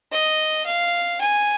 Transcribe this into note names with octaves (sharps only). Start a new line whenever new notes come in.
D#5
F5
G#5